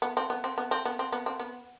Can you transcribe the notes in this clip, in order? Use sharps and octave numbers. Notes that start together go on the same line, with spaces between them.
B3
C4
B3
C4
B3
C4
B3
C4
B3
C4
B3